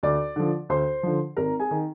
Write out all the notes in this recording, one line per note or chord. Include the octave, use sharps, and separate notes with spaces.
D2 D5 D6
D3 F3
D2 C5 C6
D3 F3
G#1 A#4 A#5
G#4 G#5
D#3